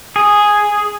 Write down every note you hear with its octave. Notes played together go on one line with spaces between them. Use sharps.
G#4